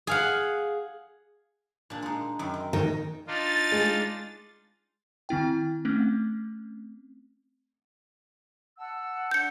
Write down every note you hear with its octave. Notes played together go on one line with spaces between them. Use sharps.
G#4 F5 F#5
A#2 D4
G#3 D#4
F#2 D#3
C4
B2 D#3
D4 D#4 F4 A6
G#3
D#3 C4 E4 G5
A3 C4 C#4
F#5 A5 E6
D4 F#5 G6 C#7